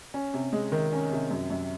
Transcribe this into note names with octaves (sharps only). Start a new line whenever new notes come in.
C#4
C3
G#3
D#3
C#4
C3
F#2
F#2